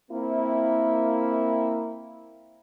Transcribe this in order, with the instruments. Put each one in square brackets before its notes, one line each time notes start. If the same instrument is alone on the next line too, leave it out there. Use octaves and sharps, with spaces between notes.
[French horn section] A#3 C4 E4